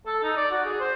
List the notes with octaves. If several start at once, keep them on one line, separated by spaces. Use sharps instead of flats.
A4
D#4
D5
F#4
G#4
C5